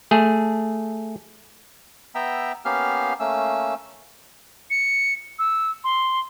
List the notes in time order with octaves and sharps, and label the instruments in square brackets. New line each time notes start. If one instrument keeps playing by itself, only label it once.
[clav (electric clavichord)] A3 G#4
[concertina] B3 E5 G5 A#5 E6
A#3 B3 C#4 G4 F5 F6
A3 A#3 C#4 E6
[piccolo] C#7
E6
C6